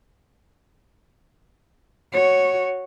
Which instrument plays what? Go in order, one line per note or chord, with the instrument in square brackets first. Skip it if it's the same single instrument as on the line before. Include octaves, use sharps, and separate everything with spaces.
[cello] F#4 C#5